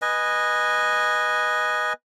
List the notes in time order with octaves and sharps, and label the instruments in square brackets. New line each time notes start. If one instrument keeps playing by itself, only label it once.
[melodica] B4 D#5 G#5